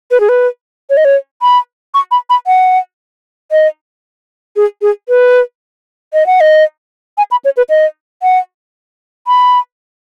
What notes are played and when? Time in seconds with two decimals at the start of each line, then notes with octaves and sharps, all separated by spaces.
0.11 B4
0.20 G#4
0.29 B4
0.90 C#5
0.97 D#5
1.05 C#5
1.42 B5
1.94 C#6
2.11 B5
2.30 B5
2.47 F#5
3.52 D#5
4.56 G#4
4.82 G#4
5.09 B4
6.13 D#5
6.26 F#5
6.41 D#5
7.18 G#5
7.31 B5
7.45 C#5
7.57 B4
7.70 D#5
8.23 F#5
9.27 B5